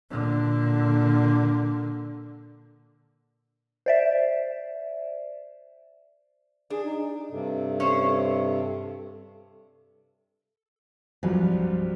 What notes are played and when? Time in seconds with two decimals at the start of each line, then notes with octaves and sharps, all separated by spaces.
0.10 A#2 D3
3.86 C5 D5 E5
6.70 D4 G#4
6.85 D#4
7.31 G2 C3 A4
7.80 C#4 C5
11.23 C2 G2 F3 F#3